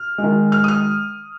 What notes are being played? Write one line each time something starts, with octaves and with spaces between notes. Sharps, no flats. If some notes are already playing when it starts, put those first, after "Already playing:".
Already playing: F6
G#3
D#3
F6
D#6
F6